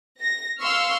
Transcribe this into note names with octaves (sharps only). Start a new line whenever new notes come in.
A#6
F5 C6 C#6 E6 F6